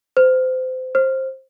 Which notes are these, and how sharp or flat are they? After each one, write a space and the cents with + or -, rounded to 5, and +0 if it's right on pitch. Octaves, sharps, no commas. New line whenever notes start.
C5 -25
C5 +15